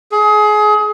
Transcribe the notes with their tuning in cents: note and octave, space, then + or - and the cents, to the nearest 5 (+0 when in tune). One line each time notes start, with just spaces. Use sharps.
G#4 +25